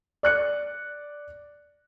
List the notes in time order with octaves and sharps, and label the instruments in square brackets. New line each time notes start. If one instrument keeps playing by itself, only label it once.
[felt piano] D5 F#6 C#7